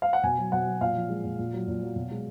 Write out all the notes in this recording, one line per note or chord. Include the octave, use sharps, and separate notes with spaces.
F5
F#5
B2 G#5
F#3
B2 F#5
F#3
A#2 F5
F3
G#3
A#2
A#2
F#3
A#2
F#3
B2
G#3